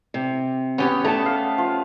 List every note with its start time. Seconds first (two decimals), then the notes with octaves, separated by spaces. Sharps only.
0.14 C3
0.78 B3 C#4 G4 C#5
1.05 A3 A5 A#5
1.26 F5
1.58 F3